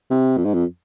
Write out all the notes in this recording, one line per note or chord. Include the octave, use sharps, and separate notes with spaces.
C3
F2
G#2
F2